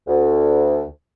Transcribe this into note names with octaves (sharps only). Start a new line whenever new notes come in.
D2